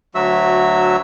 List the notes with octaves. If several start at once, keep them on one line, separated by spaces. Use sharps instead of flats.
D2 F#3 F#4 E5 E6